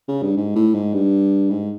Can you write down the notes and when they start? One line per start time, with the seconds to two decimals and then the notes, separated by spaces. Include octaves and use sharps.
0.08 C#3
0.22 G2
0.37 G#2
0.56 A2
0.74 G#2
0.93 G2
1.50 G#2